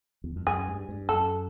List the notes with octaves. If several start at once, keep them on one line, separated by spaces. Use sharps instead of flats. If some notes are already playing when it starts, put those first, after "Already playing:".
E2
F2
F#2 G#4
G2
G2
F#2 A4